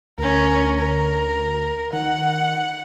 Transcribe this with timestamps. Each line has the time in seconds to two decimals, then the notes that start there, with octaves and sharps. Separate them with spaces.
0.18 D2 C#4 A#4
0.78 A#4
1.93 D#3 F#5